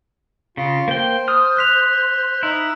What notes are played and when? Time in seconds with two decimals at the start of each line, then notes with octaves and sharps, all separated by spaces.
0.57 C#3 F4
0.88 A#3 C5 G5
1.28 D#6 F6
1.57 F#6 B6 F7
2.43 D#4 E4